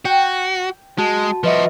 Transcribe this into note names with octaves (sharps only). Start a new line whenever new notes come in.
F#4 G5
G#3 F#4 A5
F3 F#4 B4 D#5 E5